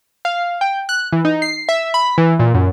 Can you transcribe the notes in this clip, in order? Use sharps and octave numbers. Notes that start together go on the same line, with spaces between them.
F5
G5
F#6
E3
D#4
C7
E5
B5
E3
A#2
F#2